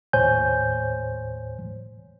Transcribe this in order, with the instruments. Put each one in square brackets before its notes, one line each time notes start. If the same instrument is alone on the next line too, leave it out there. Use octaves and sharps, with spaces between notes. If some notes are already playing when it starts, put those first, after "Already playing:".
[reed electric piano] D#2 A2 C5 C#5 G#5 G6